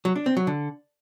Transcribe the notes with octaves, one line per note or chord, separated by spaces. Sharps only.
F#3
D4
C4
F#3
D3